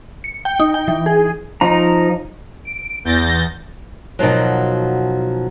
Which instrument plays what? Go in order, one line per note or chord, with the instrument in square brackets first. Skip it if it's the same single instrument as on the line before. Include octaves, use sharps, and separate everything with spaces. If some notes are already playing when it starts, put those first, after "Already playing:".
[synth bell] C#7
G5
D#4
G5
E3
G#4
[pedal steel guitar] F3 D#4 A#5
[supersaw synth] D7
E2 G6 A6 A#6
[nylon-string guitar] B2 D#3 F3 F#3